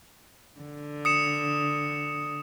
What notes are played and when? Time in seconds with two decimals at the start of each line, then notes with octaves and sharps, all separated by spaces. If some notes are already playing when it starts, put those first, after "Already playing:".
0.60 D3
1.05 D#6 C#7 E7